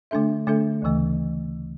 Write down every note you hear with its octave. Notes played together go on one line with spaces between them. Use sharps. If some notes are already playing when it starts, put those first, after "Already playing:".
D3 A3 D4 A4 E5
D3 A3 D4 A4 E5
D2 C#3 E3 A3